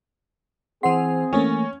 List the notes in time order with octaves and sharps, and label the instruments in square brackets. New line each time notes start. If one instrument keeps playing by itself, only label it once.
[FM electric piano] E3 C5 C6 [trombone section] C4 G#4 [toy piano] F#5
[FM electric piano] E3 A3 A#3 [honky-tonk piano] C#4